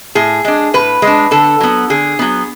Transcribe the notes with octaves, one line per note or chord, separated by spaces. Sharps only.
A2 G#4
G#3 D4
A2 B4
G#3
D4
D3 A4
F#3 B3
D3 G#4
F#3 B3